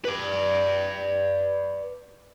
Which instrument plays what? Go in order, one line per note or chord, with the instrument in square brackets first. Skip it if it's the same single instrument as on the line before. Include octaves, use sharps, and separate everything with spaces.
[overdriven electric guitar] B4 D5